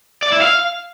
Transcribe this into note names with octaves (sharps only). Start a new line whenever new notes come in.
D5
E4
F5